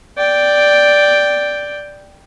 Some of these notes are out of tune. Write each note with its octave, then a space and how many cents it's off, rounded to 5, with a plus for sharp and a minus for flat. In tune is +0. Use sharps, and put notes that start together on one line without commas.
D5 +0 G5 +0